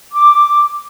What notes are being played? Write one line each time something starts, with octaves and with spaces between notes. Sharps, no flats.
D6